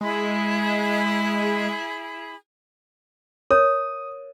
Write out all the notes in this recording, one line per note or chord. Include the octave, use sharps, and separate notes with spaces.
G#3 E4 G#4 B5
A#4 C#5 D6 D#6